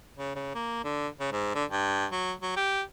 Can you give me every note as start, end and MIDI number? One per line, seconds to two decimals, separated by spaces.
0.18 0.33 49
0.36 0.50 49
0.55 0.81 58
0.84 1.08 50
1.20 1.28 49
1.32 1.55 44
1.55 1.65 50
1.70 2.06 43
2.12 2.33 54
2.42 2.56 54
2.57 2.82 67